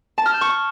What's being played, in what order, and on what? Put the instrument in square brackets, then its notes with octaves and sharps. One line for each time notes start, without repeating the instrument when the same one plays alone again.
[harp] A5
F6
G6
C#6